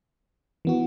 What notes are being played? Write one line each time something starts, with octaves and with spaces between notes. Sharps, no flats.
E3 B3 F#4